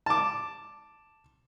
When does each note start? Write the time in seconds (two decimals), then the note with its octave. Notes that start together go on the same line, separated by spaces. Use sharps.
0.06 A5 D6